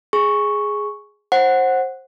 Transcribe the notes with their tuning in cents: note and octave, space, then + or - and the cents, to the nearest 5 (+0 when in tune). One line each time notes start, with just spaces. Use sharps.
G#4 +0 C#6 +0
C5 +20 F#5 +0